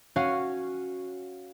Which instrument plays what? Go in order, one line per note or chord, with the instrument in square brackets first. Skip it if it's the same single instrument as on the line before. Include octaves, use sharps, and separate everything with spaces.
[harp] C#4 F#4 C#5 F5 G#5